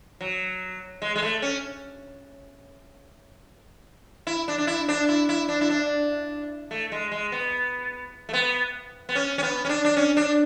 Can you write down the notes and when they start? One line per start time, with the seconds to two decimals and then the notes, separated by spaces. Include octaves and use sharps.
0.21 F#3
1.02 G#3
1.16 G#3
1.22 A3
1.42 C#4
4.27 E4
4.48 D4
4.58 D4
4.67 E4
4.89 D4
5.09 E4
5.29 E4
5.49 D4
5.61 E4
5.70 D4
6.71 A3
6.92 G#3
7.12 G#3
7.32 B3
8.29 A3
8.33 B3
9.09 B3
9.15 C#4
9.38 C#4
9.43 B3
9.65 C#4
9.69 D4
9.85 D4
9.97 C#4
10.17 D4